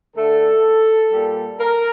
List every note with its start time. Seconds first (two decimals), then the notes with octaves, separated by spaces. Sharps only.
0.16 D3 A3 A4
1.12 A#2 G3
1.59 A#4